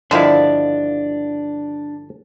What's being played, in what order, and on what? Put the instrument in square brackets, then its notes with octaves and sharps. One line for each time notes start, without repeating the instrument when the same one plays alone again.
[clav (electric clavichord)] G1 F3 E4 [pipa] D3 D#3 [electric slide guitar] D4 [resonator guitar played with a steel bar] D5 F5